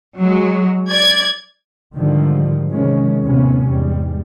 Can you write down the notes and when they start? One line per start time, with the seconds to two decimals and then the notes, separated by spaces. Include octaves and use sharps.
0.19 F#3 G#3
0.90 D5 G#6
1.95 G#2 D3 D#3 F3 G3
2.71 C3 D#3 F3 G#3 C#4
3.24 D#2 A2 C3 B3 C#4
3.66 E2 G#2 G3